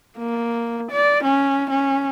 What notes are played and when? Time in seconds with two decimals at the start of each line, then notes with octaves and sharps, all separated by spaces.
0.18 A#3
0.91 D5
1.24 C#4
1.70 C#4